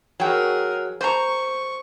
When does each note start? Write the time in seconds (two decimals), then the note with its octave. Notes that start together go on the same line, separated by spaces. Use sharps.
0.20 F#3 G#4 A#4 G5
1.01 C5 A#5 C#6